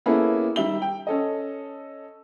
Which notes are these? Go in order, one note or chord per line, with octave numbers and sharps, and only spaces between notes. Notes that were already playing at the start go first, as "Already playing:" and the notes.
A#3 B3 C#4 E4 G#4 A4
D#3 G3 E5 G7
G5
C#4 A4 D#5